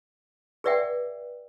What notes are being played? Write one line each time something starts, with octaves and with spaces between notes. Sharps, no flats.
G#4 B4 D5 E5 F#5 G5